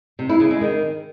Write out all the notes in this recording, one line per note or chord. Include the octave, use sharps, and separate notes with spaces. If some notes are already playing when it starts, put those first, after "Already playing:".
C3
E4
C#3
G#3
D#3